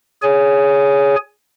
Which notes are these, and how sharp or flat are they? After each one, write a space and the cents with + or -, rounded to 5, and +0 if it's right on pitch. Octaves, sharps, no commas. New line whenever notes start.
G#4 +0 C#5 +15 G#5 +0